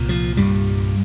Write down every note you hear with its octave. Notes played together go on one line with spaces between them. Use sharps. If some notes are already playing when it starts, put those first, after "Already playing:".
Already playing: C2 A#2
F3
G2 G3